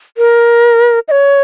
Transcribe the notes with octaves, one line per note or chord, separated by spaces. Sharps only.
A#4
D#5
C#5